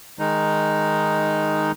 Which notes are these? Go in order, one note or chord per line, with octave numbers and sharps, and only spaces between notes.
D#3 G#3 D#4